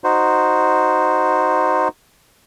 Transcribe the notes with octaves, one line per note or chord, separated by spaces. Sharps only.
D#4 F#4 C5